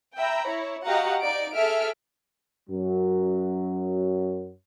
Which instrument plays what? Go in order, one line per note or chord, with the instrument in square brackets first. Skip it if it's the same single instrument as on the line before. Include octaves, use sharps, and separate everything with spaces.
[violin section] E5 G5 A#5 B5
E4 C#5
F#4 G4 D#5 F5 F#5 A#5
D#4 D5 D7
G#4 A4 E5 F6 D7
[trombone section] F#2 F#3